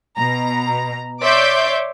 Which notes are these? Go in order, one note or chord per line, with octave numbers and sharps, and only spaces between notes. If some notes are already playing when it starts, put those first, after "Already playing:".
B2 A#5
C#5 D5 E5 C6 D6 G6